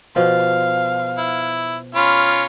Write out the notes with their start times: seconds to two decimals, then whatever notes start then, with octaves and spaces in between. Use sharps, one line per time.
0.16 B2 F3 F5
1.18 E4
1.95 C#4 F4 B5